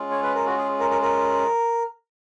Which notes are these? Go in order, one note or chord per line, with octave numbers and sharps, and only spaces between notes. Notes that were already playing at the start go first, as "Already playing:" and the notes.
Already playing: G#3 C#4 F4
C#5
B4
A#4
F#4
G#4
A#4
A#4
A#4